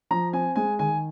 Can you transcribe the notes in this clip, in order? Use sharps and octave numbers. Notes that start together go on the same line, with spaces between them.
F3 A#5
C4 G#5
G#3 G#5
D#3 G#5